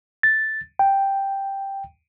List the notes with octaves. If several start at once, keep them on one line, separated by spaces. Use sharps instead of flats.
A6
G5